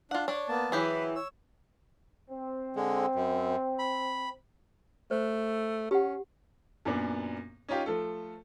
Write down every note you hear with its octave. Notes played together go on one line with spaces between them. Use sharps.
D4 F4 F#5
D4 C#5 D5
A#3 B3 A5
E3 F#3 G4 G#4 B5
C#5 E6
C4
D3 G#3
F#2
B5
A3 C5
C#4 G4 F#5
F#2 A#2 B3 D4
C#4 D#4 F4 G4
F3 A3 A4